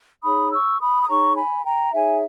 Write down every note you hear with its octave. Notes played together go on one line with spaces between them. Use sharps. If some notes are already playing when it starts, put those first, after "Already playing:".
D#4 G#4 C#5 B5 D#6
C#6 E6
B5 D#6
D#6
D#4 G#4 C#5 A#5 C#6
G#5 B5
G5 A#5
D#4 G#4 C#5 E5 G#5